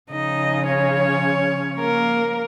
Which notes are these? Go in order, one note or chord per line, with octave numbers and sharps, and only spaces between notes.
C#3 F3 D#4 D#5
C#4 C#5
A#3 A#4